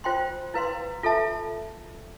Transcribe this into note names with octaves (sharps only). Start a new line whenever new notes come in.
F4 C5 G5 C6
E4 B4 F5 C6
F4 A4 E5 A5